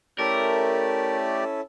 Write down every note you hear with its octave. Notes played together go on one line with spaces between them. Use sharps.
A3 C#4 E4 G4 A4 A#4 D5